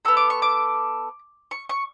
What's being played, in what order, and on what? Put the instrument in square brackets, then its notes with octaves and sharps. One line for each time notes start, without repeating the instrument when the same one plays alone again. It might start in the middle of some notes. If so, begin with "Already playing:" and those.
[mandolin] F#4 A4 E6
B3
D6
C#6
D6
C#6
C#6